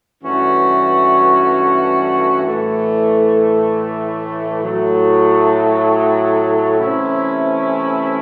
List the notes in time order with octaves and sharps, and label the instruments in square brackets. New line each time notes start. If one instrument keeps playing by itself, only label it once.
[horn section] G2 E3 A3 C#4 F#4
A2 E3 A3
A2 F#3 A3
C3 E3 A3 C#4 E4